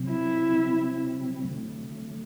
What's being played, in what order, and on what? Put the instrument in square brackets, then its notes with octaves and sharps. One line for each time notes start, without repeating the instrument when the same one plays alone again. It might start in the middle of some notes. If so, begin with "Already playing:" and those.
Already playing: [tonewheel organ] C3 F#3 C4
[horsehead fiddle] E4
[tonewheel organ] D3 F#3 A3